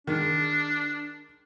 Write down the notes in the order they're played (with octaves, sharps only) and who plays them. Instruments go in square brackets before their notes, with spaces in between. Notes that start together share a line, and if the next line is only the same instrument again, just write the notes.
[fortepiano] D#3 G#3 [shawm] D4